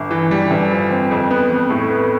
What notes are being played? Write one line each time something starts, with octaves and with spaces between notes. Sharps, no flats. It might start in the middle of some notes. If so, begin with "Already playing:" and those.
Already playing: G1
E3
G3
G1
F3
C4
F2
B3
F2
A2
B3